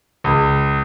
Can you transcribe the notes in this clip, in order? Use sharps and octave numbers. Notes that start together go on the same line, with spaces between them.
C#2